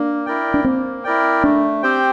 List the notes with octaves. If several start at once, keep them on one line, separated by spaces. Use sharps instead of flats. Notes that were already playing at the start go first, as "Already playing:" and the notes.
Already playing: A#3 D4
E4 A#4 D5 G5
D4
A#3 C4
E4 A#4 D5 G5
A3 D4
C4 G4 C5 G5